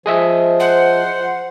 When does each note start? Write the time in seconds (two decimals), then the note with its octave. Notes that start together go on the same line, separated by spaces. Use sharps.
0.06 F3 G#4 D#5 E5
0.60 C5 F#5